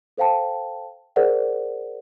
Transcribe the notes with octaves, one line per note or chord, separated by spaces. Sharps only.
A4 C5 F5 G5 A5
G#4 A#4 C5 D5 F#5